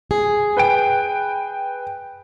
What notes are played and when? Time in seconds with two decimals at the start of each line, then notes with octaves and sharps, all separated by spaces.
0.11 G#4
0.57 B4 G5 D7